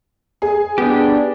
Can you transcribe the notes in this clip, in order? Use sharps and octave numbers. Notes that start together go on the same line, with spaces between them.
G#4
B3 D4 G4